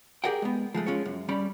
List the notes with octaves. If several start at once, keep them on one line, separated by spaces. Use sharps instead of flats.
G4 G#4 A#4 D5 F#5 G5
G#3 B3
F3 G#3 A3
G#3 C#4 F4 C#5
F#2
G2 G3 C#4 D5 B5